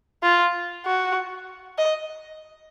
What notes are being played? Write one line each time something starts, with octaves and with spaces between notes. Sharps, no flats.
F4
F#4
D#5